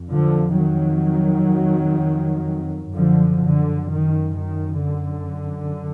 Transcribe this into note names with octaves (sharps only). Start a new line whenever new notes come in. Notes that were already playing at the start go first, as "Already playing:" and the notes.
Already playing: F2
D3 F3
D#3 F#3
F#2 D3 F3
D3
D#3
D#3
D3